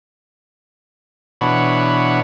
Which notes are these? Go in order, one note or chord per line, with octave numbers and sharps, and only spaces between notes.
B2 E3 D4 C#5 F#5 B5